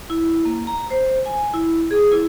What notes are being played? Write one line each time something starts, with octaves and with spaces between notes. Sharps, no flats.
E4
A#3
A#5
C5
G#5
E4
G#4
E4